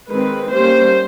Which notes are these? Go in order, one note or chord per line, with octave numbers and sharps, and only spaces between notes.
D#3 G#3 C4 B4
G3 A#3 C#4 C5